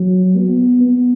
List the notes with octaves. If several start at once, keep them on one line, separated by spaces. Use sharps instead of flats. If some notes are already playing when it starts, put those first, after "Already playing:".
Already playing: F#3
B3
B3